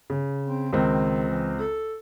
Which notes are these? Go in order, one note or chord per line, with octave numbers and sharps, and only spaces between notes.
C#3
C4
C#2 D#3 C4
E3
A4